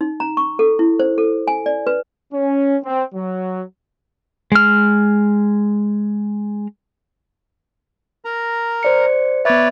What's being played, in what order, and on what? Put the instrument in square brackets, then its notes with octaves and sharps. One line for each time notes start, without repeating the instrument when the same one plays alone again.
[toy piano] D#4
A#5
C#6
A4
E4
C5
A4
G#5
D5
B4
[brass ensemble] C#4
C4
F#3
[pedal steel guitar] G#3 F6
[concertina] A#4 A#5
[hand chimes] C5 D5 C#7
[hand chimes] B3 E5 [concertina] B4 C#5 D5